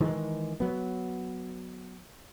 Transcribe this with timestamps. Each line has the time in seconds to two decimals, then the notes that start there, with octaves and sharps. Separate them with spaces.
0.01 D#3 E3 G#3
0.60 F#3 B3